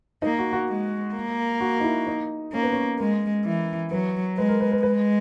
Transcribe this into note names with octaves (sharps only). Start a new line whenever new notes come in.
A#3 D#4
F#4
F#4
G#3
A#3
F#4
D#4
E4
D#4
A#3 C#4
B3
C#4
G#3 A#4
E3
F#3 B4
G#3 B4
A#4
B4
B4
G#3 B4